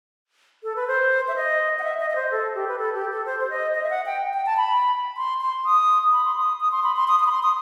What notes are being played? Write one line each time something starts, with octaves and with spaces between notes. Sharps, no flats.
A4
B4
C5
E5
D#5
F#5
E5
D#5
D#5
C5
A4
G4
B4
A4
G4
A4
C5
C5
D#5
D#5
E5
F#5
G5
G5
A5
B5
C6
C6
D#6
B5
C6
D#6
D#6
C6
B5
C6
D#6
D#6
B5
C6
D#6